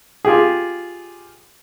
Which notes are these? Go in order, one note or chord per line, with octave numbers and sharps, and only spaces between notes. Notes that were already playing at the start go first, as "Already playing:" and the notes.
F4 G4 G#4